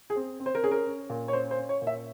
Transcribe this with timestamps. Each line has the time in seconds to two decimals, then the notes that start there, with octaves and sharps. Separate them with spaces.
0.10 G#4
0.16 C4
0.40 C4
0.46 C5
0.55 A#4
0.63 C#4 G#4
0.71 A#4
0.87 C#4
1.10 A#2
1.28 C#5
1.33 C#4 C5
1.51 C5
1.58 C#4
1.69 C#5
1.82 A#2
1.87 E5